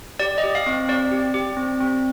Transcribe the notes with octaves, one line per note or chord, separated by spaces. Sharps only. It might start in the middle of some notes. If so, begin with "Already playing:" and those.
G4 D5
D#5
G4
F5
C4
C4 D5
G4
G4
C4
C4